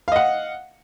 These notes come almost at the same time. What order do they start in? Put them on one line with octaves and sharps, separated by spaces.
F5 D#5 F#5